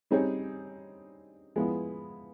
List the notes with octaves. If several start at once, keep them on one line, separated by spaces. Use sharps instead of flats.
G3 C4 D#4 G#4 C#5
F3 G#3 B3 E4